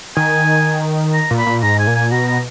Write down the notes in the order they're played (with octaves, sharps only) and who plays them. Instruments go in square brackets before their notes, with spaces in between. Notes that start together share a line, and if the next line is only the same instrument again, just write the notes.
[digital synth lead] D#3 [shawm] G#5
[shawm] A#5
[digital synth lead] A#2
[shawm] B5
[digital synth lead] A#2
[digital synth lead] G#2 [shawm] A#5
[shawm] G#5
[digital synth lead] A#2
[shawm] G#5
[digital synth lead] B2 [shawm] A#5
[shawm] A#5